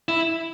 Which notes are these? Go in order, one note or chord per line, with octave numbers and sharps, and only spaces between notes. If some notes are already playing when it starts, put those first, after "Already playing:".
E4